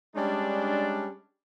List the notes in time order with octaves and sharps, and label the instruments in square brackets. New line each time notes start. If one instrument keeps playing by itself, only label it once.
[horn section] G3 G#3 C#4 D4